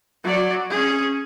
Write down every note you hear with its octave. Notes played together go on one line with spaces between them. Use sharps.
F#3 D5
C#4 G#4